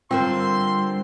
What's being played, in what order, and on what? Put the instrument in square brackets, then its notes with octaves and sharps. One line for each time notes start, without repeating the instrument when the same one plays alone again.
[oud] G2 D3 G3 [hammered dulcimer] C4 [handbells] F4 A#4 [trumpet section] C6